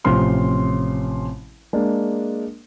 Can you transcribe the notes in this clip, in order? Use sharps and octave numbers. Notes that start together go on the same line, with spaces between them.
A1 C3 F3 C4 C6 F6
G#3 A#3 D4